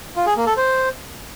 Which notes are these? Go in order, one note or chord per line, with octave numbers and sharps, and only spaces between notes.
F4
G#4
A#3
A4
C5